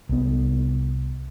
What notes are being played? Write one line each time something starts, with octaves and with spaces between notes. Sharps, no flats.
C2 B3